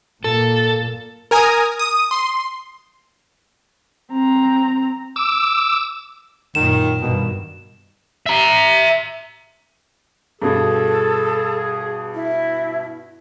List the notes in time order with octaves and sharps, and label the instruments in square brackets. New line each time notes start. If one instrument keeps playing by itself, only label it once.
[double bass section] A#2 A#3 [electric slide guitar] A4
[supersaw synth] A#4 G#5 A#5 D#6
D#6
C6
[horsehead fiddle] C4 A#5
[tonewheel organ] D6 E6
[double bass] F#2 A#2 [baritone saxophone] D#3 [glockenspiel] E7
[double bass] G2 D#3 [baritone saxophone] B2
[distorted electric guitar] E5 A#5
[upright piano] G2 B2 [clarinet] G#4 [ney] A4
[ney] E4